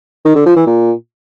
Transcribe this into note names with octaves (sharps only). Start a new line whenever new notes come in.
D#3
D3
F3
E3
A#2